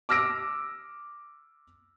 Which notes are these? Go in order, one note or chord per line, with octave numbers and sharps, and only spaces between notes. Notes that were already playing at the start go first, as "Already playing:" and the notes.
D6 E6 F6 A#6 D7